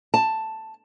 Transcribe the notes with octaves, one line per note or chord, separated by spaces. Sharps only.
A5